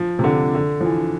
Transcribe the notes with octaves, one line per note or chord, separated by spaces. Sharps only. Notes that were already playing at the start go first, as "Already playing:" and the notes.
Already playing: F3
C3
D3
D3
F3
E3